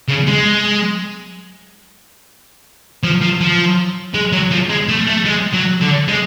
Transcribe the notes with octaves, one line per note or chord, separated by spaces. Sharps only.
C#3
G#3
F3
F3
F3
G#3
F#3
F3
G#3
A3
A3
G#3
F#3
D3
G#3